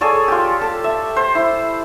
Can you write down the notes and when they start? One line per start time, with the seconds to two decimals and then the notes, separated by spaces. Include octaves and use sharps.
0.01 G#4 A4 C#5 D5
0.28 F4 G4
0.61 A4 A5
0.84 E5
1.16 C5
1.35 E4